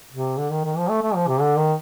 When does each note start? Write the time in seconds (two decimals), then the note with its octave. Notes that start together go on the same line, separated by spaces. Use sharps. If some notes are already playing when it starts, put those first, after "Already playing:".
0.12 C3
0.38 D3
0.51 D#3
0.64 D#3
0.77 F3
0.90 A3
1.02 A3
1.15 F3
1.27 C3
1.41 D3
1.58 D#3